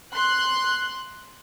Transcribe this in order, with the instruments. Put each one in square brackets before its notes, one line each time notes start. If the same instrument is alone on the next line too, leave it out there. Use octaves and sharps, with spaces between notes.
[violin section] C6 F#6